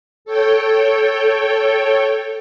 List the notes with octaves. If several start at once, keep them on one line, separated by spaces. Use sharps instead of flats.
A4 C#5 G5